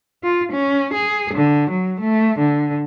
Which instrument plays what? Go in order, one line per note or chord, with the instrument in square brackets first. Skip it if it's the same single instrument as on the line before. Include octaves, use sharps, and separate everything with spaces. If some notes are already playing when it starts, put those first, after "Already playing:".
[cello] F4
C#4
G#4
D3
F#3
A3
D3